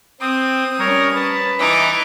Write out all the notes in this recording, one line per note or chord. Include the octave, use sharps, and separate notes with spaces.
C4 D#6
G3 C#4 A#4 C#5
B4 A5
E3 D#4 D6